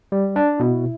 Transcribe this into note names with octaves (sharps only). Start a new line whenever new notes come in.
G3
D4
B2 E4